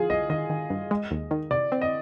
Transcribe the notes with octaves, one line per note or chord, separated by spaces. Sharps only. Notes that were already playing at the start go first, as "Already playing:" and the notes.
Already playing: F3 F4 G#4
C2 D#5
D#3 D#5
D#3
G2
G#3
D#2
D#3
C3 D5
C4
D#5